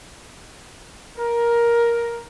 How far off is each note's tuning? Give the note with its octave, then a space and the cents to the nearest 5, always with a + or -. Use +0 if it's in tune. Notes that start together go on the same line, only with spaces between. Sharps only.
A#4 +10